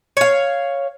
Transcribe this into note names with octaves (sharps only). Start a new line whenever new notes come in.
C#5 F5